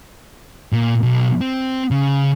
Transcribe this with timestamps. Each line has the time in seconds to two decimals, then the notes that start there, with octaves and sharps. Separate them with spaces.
0.72 A#2
1.03 B1
1.41 C4
1.91 C#3